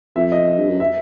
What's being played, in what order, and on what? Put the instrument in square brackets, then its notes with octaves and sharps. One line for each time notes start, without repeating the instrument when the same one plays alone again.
[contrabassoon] F2 [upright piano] E5
[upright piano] D#5
[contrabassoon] G2
F#2
[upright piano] E5